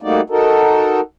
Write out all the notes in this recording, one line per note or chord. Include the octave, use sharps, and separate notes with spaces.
G3 A3 A#3 D#4 F#4 D5
D#4 F#4 A4 A#4